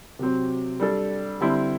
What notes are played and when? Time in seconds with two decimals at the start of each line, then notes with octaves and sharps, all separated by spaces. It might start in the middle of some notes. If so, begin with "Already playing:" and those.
0.19 C3 F#3 C4
0.80 G3 D4 A4
1.41 D3 G3 C4 E4